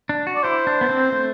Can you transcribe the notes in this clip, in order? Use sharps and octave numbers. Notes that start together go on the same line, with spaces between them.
D4
F#4
D5
E4 C5
D4
B3
C4
A3